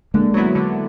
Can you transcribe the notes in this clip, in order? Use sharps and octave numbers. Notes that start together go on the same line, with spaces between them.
D3 G#3 A#3
F#3 B3 E4
D3